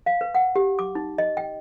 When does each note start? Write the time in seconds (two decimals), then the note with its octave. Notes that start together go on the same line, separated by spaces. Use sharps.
0.06 F5
0.21 B4
0.35 F#5
0.56 G4
0.79 D6
0.95 D#4
1.18 D#5
1.37 G5